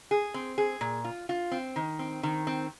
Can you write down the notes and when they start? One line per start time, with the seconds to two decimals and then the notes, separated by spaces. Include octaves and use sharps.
0.11 G#4
0.34 C4
0.58 G#4
0.81 A#2
1.04 F4
1.29 F4
1.51 C4
1.76 D#3
1.99 C4
2.23 D#3
2.47 C4